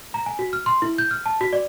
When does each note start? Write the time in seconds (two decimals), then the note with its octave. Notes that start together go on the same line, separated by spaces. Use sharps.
0.14 A#5
0.26 G#5
0.39 F#4
0.53 F6
0.66 C6
0.82 E4
0.98 G6
1.11 F6
1.26 A5
1.41 F#4
1.53 D5